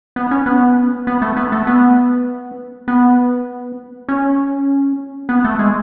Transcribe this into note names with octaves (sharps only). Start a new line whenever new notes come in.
B3
C#4
B3
B3
A3
B3
A3
B3
B3
C#4
B3
A3
G#3